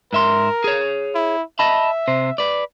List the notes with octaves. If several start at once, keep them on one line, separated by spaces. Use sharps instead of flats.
G#2 A#4 E5 C6
G#4 C#5
E4
D#5 E5 A5 B5
C3 C5
B4 D5